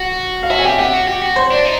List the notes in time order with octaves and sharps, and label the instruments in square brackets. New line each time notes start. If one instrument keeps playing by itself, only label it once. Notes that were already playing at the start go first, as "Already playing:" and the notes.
Already playing: [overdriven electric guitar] F#4
[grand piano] F5
[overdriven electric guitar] F#4 [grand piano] E5
[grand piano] G#5
[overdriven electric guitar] G4 [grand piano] G5
[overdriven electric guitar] G4 [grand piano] F#5
[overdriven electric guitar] F#4
G4
F#4
[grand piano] C5
[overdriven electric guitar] D4
D#4